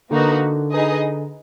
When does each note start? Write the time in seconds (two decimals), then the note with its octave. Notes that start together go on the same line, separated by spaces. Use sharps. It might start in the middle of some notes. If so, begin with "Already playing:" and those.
0.10 D3 A#3 D#4 F#4 B4
0.71 D#4 G#4 B4 D#5